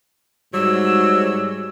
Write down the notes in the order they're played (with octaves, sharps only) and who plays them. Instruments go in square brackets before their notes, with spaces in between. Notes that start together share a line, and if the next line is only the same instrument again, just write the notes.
[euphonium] G#2 [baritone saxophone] F#3 [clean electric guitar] G3 [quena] E6